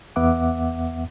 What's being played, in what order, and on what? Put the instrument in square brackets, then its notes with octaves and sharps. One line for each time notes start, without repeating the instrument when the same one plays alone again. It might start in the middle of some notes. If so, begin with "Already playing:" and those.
[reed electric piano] E2 B3 E5 F#5 D6